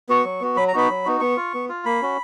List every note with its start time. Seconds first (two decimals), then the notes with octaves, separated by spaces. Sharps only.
0.09 B3 F#4 C#6
0.25 F#3
0.41 B3 F#4
0.56 F#3 B5
0.68 A#5
0.74 B3 D#4 F#4 B5
0.90 F#3
1.05 B3 D#4 F#4
1.21 B3 C#6
1.37 F4
1.54 B3
1.69 F4
1.85 A#3 B5
2.02 C#4 F#4